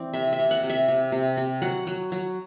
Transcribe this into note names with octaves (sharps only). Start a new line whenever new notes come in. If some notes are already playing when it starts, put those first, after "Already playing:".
Already playing: E3 C4 D5
C3 E5
E5
C3
F#5
C3
E5
C3
C3
C3
F#3 F#5
F#3
F#3